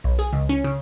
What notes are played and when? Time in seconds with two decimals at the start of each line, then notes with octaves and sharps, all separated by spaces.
0.04 B1
0.19 G#4
0.33 C#2
0.49 C#4
0.64 C#3